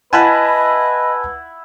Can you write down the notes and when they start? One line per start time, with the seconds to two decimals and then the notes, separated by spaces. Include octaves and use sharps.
0.13 E4 B4 D#5 F#5 G#5 A5 B5